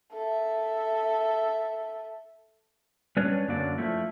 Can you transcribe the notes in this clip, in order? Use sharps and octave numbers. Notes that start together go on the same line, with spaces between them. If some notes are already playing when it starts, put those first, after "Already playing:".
A4 E5
G3 C#4 D4 B4 C#5
F#2 D3 F#3 A#3 D5
F3 A3 E4